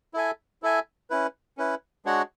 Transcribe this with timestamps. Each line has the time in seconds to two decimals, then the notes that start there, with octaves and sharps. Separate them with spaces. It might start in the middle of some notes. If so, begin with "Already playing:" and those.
0.14 E4 A4 E5 G#5
0.63 E4 A4 E5 G#5
1.10 C#4 E4 B4
1.58 C#4 E4 B4
2.05 G#3 D4 F#4 C#5 F#5